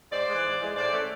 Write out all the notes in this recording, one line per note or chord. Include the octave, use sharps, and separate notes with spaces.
G#2 C5 D5
G#3
E3
G#2
E3 G#3
A2 C5 D5
E3 A3 C#4